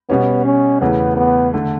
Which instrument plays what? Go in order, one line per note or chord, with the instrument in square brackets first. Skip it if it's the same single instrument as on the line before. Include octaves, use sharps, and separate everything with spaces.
[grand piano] B2 G3 C#4 [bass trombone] B3
[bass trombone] C#4
[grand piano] E2 C#3 E3 A3 [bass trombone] B3
[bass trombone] B3
[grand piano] D3 A3